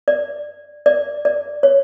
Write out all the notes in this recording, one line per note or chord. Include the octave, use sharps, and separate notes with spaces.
D5
D5
D5
C#5